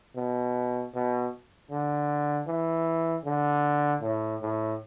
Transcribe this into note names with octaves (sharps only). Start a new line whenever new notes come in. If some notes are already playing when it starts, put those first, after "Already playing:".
B2
B2
D3
E3
D3
A2
A2